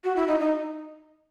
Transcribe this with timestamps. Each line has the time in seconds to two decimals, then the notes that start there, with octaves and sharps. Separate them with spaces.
0.04 F#4
0.16 E4
0.28 D#4
0.40 D#4